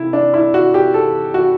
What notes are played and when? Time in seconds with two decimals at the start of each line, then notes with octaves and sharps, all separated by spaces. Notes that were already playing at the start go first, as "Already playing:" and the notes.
Already playing: C3 E4
0.13 D4
0.34 E4
0.54 F#4
0.74 G4
0.94 A4
1.34 F#4